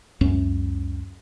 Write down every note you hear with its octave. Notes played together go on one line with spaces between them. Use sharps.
C#2 F#2 C#4